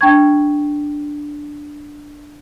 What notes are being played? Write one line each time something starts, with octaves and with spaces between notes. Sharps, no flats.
D4 G5 A5 C#6 G#6